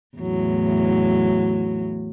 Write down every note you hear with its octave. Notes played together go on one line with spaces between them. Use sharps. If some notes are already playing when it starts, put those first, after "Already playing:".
E2 A2 F#3